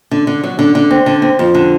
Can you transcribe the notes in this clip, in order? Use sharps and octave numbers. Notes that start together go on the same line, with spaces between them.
D3
D3
F#3
D3
D3
C4
D3
C4
F2
D3